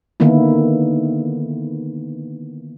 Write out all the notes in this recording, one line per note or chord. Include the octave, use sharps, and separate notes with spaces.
D3 D#3 A#3 B3 E4